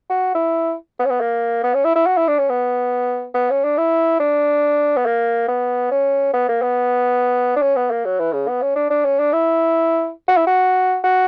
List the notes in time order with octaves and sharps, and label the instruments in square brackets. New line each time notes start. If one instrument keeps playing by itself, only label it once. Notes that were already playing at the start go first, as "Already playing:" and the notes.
[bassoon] F#4
E4
B3
C#4
B3
A#3
B3
C#4
E4
E4
F#4
E4
D4
C#4
B3
B3
C#4
D4
E4
D4
B3
A#3
B3
C#4
B3
A#3
B3
D4
C#4
B3
A#3
F#3
E3
C#3
B3
C#4
D4
D4
C#4
D4
E4
F#4
E4
F#4
F#4